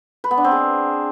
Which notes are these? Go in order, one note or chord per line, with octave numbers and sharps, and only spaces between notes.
B4
B3
D4
C4
G#4